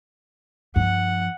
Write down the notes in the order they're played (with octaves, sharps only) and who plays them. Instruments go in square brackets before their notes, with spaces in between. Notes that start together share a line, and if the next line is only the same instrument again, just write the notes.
[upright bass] G2 F3 [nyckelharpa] F#5